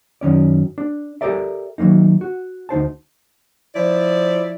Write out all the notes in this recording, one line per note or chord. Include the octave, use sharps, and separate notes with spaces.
F#2 D#3 C#4 D5
D4
G4 A4 A#4 D5 E5
D#3 F#3 G#3 A#3 D#4
F#4
D2 D#4 C5 A5
F3 E4 D5